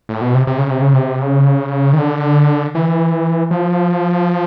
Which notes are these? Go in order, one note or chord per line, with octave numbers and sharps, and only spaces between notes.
A2
B2
C3
C3
C#3
C3
C#3
C3
C#3
D#3
D3
E3
F3